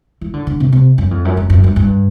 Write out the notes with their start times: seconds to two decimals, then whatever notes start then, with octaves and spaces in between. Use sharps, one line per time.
0.21 E3
0.33 D3
0.47 D3
0.60 C3
0.72 C3
0.98 F#2
1.11 F2
1.25 F#2
1.37 F#2
1.50 F#2
1.64 G2
1.76 G2